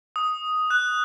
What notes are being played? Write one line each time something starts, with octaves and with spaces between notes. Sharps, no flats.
D#6
F#6